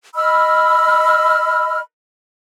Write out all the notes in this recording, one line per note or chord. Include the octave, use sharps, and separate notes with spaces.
D#5 B5 E6 F6